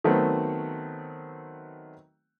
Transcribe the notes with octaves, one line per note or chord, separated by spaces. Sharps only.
D#3 F#3 A3 B3 C4